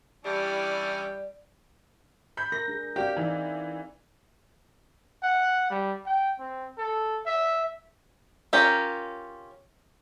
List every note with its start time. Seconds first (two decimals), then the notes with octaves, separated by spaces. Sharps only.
0.24 E3 G3 C#4 D4 E4 G4 D5
2.37 B5 G6
2.52 A#4 A#6
2.68 D4 G#4
2.96 C4 F#4 G4 D5 F5
3.17 E3 D#4 D5
5.23 F#5
5.70 G3
6.06 G5
6.39 C4
6.78 A4
7.26 E5
8.53 C#4 F4 G4 A#4